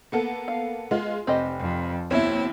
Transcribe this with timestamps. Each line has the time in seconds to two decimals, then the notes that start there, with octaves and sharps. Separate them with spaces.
0.12 A#3 B3 A4
0.48 F5
0.91 G#3 B3 F4
1.27 F1 C4 G4 D#5
1.59 F2
2.11 D#2 B2 C4 E4 C#5 E5